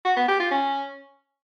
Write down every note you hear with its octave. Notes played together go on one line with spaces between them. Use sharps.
F#4
B3
G4
F4
C#4